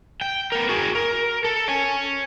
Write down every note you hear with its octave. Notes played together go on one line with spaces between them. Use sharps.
G5
B3 A#4
F#4 G#4
A#4
A4
C#5 G#5